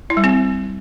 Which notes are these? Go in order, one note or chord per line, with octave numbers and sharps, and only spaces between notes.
E4
G3
C4